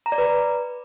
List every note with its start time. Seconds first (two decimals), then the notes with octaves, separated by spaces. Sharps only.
0.06 A#5
0.12 D5
0.18 B4